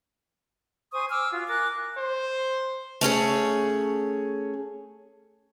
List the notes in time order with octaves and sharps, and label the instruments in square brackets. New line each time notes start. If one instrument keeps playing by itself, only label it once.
[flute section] C5 G#5 C#6 D#6
G#5 D6 E6 F6
F4 F#4
A#4 G#5 D6 F#6
[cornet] C5
[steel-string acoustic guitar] A3 C#4 G#4 C#5